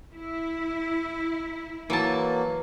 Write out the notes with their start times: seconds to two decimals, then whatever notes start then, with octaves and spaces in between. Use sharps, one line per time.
0.13 E4
1.90 E3 F#3 A#3 A5